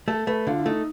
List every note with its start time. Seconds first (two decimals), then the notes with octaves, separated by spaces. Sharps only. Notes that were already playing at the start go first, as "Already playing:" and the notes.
0.08 A3 A4
0.27 A3 B4
0.47 D3 F4
0.59 E4
0.66 A3 D#4